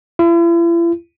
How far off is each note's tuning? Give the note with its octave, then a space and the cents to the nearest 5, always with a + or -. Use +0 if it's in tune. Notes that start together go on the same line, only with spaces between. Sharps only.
E4 +45